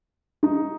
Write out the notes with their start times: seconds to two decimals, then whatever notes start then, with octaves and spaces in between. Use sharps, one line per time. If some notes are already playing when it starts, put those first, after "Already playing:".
0.43 D#4